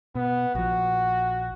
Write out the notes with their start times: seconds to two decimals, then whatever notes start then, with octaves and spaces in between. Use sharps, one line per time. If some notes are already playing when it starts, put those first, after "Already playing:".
0.15 B2 B3
0.55 A#1 F3 F#4